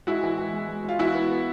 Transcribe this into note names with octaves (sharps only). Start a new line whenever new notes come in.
G#3 E4 F#4
E3
E3
G#3
G#3
G#3 F4
E3 E4 F#4
B3
B3